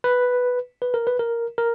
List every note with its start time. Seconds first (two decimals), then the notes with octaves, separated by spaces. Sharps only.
0.04 B4
0.82 B4
0.94 A#4
1.07 B4
1.19 A#4
1.58 A#4